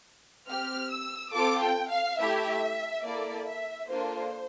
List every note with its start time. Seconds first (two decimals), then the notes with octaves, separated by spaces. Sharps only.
0.48 C4 G4 F6
0.91 E6
1.34 C4 F4 A4 D6
1.62 G5
1.91 F5
2.19 A3 E4 G4 E5
3.05 A#3 E4 A4 D5
3.47 E5
3.90 A#3 D4 F4 A4 C5